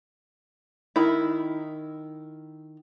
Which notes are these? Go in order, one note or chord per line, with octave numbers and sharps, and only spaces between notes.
D#3 E4